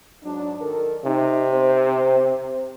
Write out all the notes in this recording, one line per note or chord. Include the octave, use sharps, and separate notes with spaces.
G#2 F#3 D4
D#3 A4 A#4
C3 D#4
C4 C5